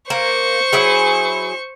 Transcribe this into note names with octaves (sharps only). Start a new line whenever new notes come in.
A#3 C5 C#6
F#3 E4 G#4